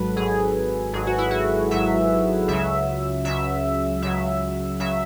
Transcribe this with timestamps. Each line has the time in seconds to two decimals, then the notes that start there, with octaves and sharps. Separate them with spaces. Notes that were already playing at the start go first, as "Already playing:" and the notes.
Already playing: G#1 G#2 F#3 A4 B4
0.16 G#1 G#2 F#3 G#4
0.93 G#1 G#2 F#3 G#4
1.07 F#4
1.18 E4
1.31 F#4
1.71 G#1 G#2 F#3 E5
2.48 C#2 C#3 F#3 E5
3.25 C#2 C#3 F#3 E5
4.02 C#2 C#3 F#3 E5
4.80 C#2 C#3 F#3 E5